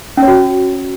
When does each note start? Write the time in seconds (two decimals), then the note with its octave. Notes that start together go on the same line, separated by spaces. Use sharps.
0.17 C#4
0.23 C#5
0.28 F#4